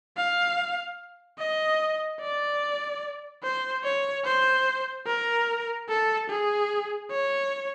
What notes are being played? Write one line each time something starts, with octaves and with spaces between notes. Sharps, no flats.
F5
D#5
D5
C5
C#5
C5
A#4
A4
G#4
C#5